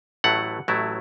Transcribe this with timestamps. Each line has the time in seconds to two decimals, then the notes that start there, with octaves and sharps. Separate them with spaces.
0.24 A1 A2 F#3 A3 E4 F#5
0.68 A1 A2 F#3 A3 E4